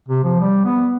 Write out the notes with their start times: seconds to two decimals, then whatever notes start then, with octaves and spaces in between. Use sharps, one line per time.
0.09 C3
0.24 F3
0.40 G3
0.65 B3